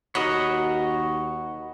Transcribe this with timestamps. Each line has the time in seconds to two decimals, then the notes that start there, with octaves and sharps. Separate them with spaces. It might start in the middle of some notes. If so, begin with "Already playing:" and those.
0.15 D#2 F#4 A#4 C#5 D#5 F#5 B5